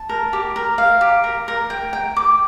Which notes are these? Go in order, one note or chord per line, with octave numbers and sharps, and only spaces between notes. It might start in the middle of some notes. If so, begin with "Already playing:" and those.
Already playing: A5
A#4
G4
A#4
F5
G4
A#4
A#4
G5
G5
D6